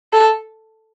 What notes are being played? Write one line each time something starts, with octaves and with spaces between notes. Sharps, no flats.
A4